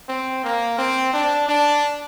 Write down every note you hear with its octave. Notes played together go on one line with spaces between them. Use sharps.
C4
A#3
C4
D4
D4